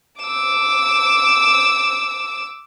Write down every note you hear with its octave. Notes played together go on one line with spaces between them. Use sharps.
D6 E6